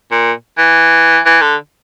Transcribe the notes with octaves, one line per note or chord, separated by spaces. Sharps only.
A#2
E3
E3
D3